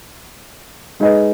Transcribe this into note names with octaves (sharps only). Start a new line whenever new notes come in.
G#3 D#4 G#4 B4 D#5